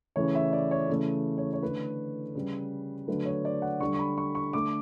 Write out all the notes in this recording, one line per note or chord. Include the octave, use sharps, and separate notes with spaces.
C#3 E3 A3 C#5
E5
D5
C#5
C#3 E3 A3
C#5
C#5
D3 A3 B4
C#3 G3
D3 F#3 A3 B4
C#5
D5
F#5
D3 G3 C#6
C#6
B5
C#6
C#6
D3 A3 D6